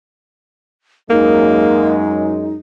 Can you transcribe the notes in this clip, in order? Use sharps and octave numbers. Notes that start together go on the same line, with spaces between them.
F#2 G#3 A#3 D#4